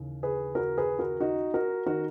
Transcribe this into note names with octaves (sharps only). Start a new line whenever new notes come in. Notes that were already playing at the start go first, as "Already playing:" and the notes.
Already playing: D#2 C#3 E3
G#4 B4
F#4 A#4
G#4 B4
F#4 A#4
D#4 F#4
F#4 A#4
D#3 F#4 A#4